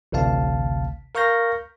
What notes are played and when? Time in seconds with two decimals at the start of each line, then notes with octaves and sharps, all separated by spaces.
0.12 A1 D2 C3 F5 A5
1.15 A#4 F5 C#6 F6 G6 A#6